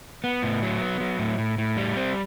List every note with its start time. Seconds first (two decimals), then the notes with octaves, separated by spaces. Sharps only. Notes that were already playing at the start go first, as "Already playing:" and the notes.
0.24 B3
0.42 A2
0.63 F#3
0.81 B3
1.00 F#3
1.19 A2
1.38 A2
1.58 A2
1.77 G3
1.96 C4